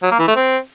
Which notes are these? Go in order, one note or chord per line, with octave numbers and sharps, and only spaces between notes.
F#3
A#3
E3
A3
C4